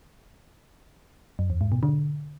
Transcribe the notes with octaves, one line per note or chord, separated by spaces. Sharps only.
F#2
E2
G#2
B2
D3